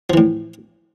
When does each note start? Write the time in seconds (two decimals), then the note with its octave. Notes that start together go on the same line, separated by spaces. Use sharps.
0.10 F3
0.14 E3
0.17 A2